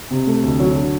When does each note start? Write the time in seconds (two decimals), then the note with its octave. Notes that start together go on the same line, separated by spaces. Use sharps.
0.10 C3
0.27 A3
0.43 D2
0.60 F#3
0.75 D3